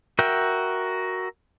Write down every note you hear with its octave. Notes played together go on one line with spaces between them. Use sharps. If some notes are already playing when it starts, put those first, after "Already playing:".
F#4 A#4 E5 G5